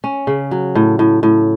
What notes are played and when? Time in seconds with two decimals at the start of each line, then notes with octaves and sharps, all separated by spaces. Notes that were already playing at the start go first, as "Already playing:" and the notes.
0.04 C#4
0.27 C#3
0.51 F#3
0.75 A2
0.99 A2
1.23 A2